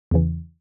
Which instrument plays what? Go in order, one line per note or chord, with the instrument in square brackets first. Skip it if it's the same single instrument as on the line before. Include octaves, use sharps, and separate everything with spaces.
[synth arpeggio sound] E2 C#3 E3